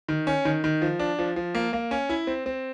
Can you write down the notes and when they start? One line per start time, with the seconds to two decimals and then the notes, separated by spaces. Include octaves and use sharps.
0.09 D#3
0.27 C#4
0.45 D#3
0.64 D#3
0.82 F3
0.99 D4
1.19 F3
1.36 F3
1.55 A#3
1.73 A#3
1.91 C#4
2.09 E4
2.27 C4
2.46 C4